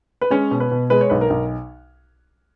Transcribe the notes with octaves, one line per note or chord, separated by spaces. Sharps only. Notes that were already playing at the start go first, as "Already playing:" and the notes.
B4
G#3 C#4 C#5
B2
B4
B2
G#3 B4
C#5
B1 B4
A#4
B1